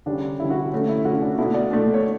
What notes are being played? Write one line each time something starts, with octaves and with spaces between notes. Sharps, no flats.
D3 G3 C#4 D4
D3 G3 C#4 E4
F#4
D3 A3 C#4
E4
D3 A3 C#4 F#4
D4
B2 A3 D4 E4
D5
B2 A3 D4
C#5